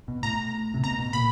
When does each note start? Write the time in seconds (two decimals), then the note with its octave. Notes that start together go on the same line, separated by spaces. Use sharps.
0.08 B2
0.23 A2 A#5
0.74 C3
0.83 B2 A#5
0.99 B2
1.13 A#2 B5